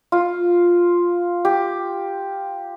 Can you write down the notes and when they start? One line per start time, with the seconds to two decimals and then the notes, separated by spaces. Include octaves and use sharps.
0.12 F4
1.45 G4